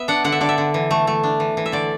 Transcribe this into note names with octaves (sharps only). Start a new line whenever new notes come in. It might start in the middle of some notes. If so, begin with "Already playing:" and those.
Already playing: B3 E5
D4 F#5
D3 F#5
E5
D3 D5
E5
D3
E3
A3
A3
D4
E3
E3
E5
D3 D5